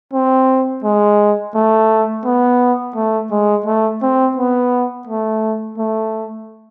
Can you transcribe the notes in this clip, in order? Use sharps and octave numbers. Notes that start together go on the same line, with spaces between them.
C4
G#3
A3
B3
A3
G#3
A3
C4
B3
A3
A3